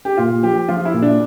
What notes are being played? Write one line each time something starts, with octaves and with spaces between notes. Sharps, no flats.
G4
A#2 F4
F3 G4
F3 F4
E4
A#2
D4